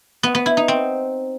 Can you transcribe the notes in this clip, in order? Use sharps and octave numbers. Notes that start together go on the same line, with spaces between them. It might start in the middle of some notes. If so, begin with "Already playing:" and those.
B3
B3
E4
D#4
C4